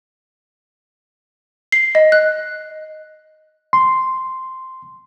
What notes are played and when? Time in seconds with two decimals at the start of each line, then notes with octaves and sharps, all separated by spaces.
1.72 C7
1.95 D#5
2.12 F#6
3.73 C6